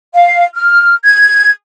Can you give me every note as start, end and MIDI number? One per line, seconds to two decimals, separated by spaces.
0.14 0.45 77
0.55 0.94 89
1.05 1.50 92